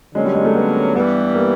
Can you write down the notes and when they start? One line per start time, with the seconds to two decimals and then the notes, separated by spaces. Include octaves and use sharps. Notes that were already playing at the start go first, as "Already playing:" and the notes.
0.14 D3 F#3 G#3 A#3 C#4
0.24 G3
0.35 G#3
0.45 A3
0.55 B3
0.95 G2 E3 G3 B3
1.35 A#3